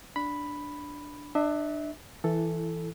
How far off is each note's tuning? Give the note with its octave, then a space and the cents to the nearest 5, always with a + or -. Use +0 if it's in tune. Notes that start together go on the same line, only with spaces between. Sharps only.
D4 +0 B5 +0
D4 +25 E5 -25
E3 +0 E4 +25 A4 +0